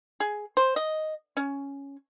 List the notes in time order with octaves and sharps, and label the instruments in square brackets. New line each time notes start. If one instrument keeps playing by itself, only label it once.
[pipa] G#4
C5
D#5
C#4